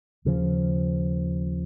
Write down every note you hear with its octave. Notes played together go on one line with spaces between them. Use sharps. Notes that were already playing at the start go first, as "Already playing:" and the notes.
D#2 C#3 F3